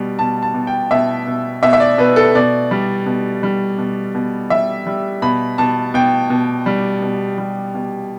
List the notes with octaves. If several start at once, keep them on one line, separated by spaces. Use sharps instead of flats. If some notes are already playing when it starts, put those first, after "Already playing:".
Already playing: B2 G3
B2 A5
A5
B2
G5
B2 E5
B2
B2 E5
E5
D5
B2 B4
A4
B2 D5
G3
B2
G3
B2
B2
G3 E5
G3
B2 B5
B2 A5
B2 G5
B2
G3
B2
G3
B2